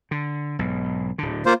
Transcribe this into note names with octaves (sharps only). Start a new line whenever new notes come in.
D3
B1 G#2
D1 D3
A#3 F4 C5